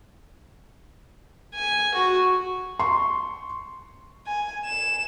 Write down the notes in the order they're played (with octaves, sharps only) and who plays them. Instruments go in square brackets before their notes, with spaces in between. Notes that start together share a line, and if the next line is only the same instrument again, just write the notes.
[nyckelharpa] G#5
F#4
[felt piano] C6 C#6
[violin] G#5
E7